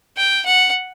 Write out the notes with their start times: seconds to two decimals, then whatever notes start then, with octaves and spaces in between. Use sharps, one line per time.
0.17 G5
0.45 F#5